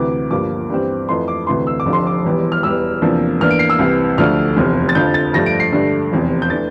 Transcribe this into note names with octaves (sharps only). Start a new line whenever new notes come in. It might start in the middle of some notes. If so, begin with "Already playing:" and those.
Already playing: D2 C3 E3 D6
G1 G2 F3 A#3 D6
G2 E3 G3 C4
F2 E3 A3 C6
D6
D2 C3 E3 A3 C6
E6
D6
F1 F2 D3 F3
C6
D6
E1 E2 E3 G3
F6
E1 E2 E3 G3 E6
E2 C3 F3 A#3 D4
E2 E3 A#3 D4 F6
D7
C7
E6
C2 C3 E3
D2 D3 F3 A3 D4 F6
F1 E2 C3
A6
F2 D3 F3 G6
A6
G2 F3 A3 D4 A#6
D7
C7
G2 D3 A3 D4
F1 E2 C3
G6
E3 A3 D4 A6